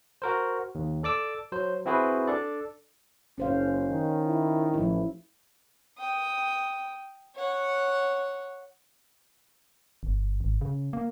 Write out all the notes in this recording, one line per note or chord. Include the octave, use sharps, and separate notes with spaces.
F#4 A#4 C5
D#2
A4 D5 D6 E6
F#3 C5
C4 E4 F#4 G#4 B4 C5
D4 A4 D5
F#1 C#4 C5 F5
D#3
E4
A1 F3 E4
G5 D#6
C#5 F#5
G1
G#1
C#3
A#3